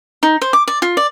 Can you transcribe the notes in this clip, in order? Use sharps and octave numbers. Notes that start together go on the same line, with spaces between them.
D#4
C5
D6
D5
F4
D5